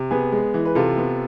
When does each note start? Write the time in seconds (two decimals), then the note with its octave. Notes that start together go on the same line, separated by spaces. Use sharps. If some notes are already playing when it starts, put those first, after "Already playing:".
Already playing: C3
0.11 B3 G#4 B4
0.32 G#3
0.54 E3
0.65 B4
0.75 C3 F4 A4
0.97 B3